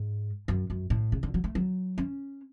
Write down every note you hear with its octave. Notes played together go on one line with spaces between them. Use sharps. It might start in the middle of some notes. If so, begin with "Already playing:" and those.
Already playing: G#2
F#2
F#2
A2
C#3
D3
F#3
A3
F#3
C#4